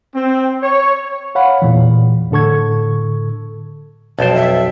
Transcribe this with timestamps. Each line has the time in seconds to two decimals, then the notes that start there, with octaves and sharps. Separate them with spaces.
0.14 C4
0.62 C#5
1.35 C#5 F5 F#5 B5
1.62 E2 A#2 E3
2.31 A2 D3 A4 C#6 G#6
4.19 B1 F2 C5 A5
4.35 E5